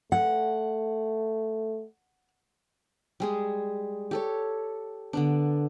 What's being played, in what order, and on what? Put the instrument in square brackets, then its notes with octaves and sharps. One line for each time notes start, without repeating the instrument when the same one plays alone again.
[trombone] A3 [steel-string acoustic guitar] F#5
[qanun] G3 G#3 G#4
G4 A4 C#5
D3 B3 D4